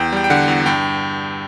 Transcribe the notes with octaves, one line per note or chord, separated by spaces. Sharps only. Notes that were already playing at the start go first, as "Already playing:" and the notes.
Already playing: E2 G5
G3 G5
G5
D3 F#5
E2
G2 G5